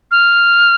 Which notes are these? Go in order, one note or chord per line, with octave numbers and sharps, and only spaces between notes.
F6